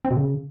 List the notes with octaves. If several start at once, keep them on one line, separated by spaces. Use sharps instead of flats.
C4
B2
C#3